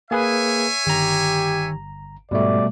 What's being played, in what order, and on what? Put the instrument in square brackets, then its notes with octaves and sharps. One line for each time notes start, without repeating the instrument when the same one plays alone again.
[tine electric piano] A#3 G#4 B4 [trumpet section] C#5 E5 G#5
[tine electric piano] G1 A#5 [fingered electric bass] D#3 [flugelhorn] G4
[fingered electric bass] G#2 [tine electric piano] B2 G3 A3 [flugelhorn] D5